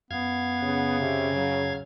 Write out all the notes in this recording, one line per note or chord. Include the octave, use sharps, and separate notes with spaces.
F#2 B3 F5 G#6
C#3
C3
F#3